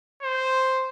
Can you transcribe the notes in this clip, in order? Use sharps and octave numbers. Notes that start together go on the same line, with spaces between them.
C5